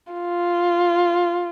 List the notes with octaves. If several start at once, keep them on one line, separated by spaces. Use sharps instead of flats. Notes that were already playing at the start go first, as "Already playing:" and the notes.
F4